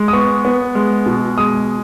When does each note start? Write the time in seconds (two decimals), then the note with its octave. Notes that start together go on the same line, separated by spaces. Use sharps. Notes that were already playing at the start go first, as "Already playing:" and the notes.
Already playing: G#3
0.08 D#6
0.13 B3 C#6
0.45 B3
0.75 G#3
1.06 B2
1.38 G#3 D#6